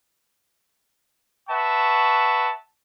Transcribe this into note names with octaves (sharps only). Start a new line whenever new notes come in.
B4 E5 F#5 A5 C#6